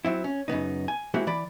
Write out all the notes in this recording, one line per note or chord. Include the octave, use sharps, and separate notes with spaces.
F#3 C4 E4
C#4
F#2 C#3 B3 D#4
G#5
G#3 A#3 C4 E4 F#4 G4
E3 D5 B5